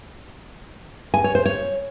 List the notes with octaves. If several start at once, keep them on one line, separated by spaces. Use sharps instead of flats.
G#5
C#5
C5
C#5